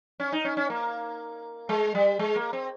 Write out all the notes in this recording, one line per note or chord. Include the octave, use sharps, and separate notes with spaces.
C#4
D#4
C#4
C#4
A#3
G#3
G3
G#3
A#3
C4